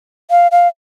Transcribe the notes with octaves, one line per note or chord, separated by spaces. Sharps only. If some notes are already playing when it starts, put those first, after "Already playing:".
F5
F5